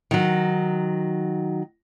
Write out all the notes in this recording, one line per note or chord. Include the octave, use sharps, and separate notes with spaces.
D#3 F#3